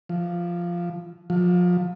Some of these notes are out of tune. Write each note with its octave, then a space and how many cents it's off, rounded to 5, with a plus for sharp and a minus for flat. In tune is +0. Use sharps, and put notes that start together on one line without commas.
F3 -5
F3 +30